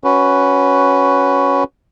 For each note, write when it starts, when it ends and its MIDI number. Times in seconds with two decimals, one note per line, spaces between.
0.04 1.64 61
0.04 1.64 66
0.04 1.64 71